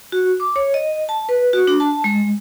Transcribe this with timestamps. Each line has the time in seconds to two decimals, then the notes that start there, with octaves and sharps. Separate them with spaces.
0.12 F#4
0.40 D6
0.56 C#5
0.74 D#5
1.09 A5
1.29 B4
1.53 F#4
1.67 D4
1.80 A5
2.04 G#3